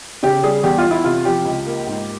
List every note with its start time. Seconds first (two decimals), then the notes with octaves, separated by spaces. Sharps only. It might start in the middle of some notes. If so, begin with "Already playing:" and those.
0.23 C#3 G4
0.43 G3 G#4
0.64 E2 G4
0.78 F4
0.84 E2
0.91 E4
1.04 C3 F4
1.25 F3 G4
1.45 C#2
1.67 A#3
1.87 G#2